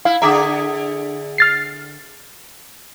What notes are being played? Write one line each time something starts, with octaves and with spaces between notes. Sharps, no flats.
E4 F5
D3 G#4 E5 A#5 D6
F6 A6 C7